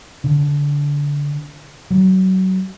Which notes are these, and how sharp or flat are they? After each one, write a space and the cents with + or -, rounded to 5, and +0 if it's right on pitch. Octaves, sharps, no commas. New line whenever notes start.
D3 -25
F#3 +25